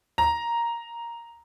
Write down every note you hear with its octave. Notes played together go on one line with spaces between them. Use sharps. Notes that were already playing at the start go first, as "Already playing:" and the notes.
A#5